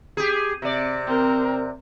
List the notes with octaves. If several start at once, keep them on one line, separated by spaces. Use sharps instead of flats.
G4 G#4
C3 D5
C4 A#4